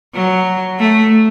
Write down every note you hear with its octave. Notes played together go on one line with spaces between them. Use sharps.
F#3
A3